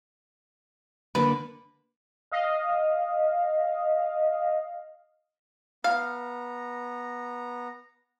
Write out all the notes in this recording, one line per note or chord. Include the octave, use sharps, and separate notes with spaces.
D3 A#3 B4
D#5 F5
B3 F5 A#5